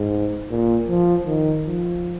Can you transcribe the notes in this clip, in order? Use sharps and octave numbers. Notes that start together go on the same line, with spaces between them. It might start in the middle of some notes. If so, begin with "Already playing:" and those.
Already playing: G#2
A#2
F3
D#3
F3